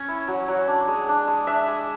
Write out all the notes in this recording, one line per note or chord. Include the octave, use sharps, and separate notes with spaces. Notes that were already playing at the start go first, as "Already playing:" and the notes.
Already playing: C#4 C#5
E4
F#3
F#3
D4
G#3
D4
G#3
D4 E5
G#3